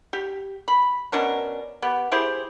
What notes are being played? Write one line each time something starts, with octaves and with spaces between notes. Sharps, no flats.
G4
B5
B2 C#4 D4 A#4
B3 G4
E4 G4 G#4 C5